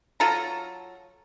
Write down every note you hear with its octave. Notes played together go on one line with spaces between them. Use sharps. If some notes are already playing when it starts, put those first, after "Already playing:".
F#3 F4 A4 A#5